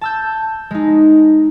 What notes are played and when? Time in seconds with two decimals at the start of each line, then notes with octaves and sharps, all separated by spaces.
0.01 A5 E6 G6
0.71 G#3 D#4